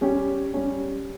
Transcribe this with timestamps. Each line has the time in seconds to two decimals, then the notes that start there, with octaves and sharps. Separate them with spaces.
0.01 G3 C#4 G4
0.53 G3 C#4 G4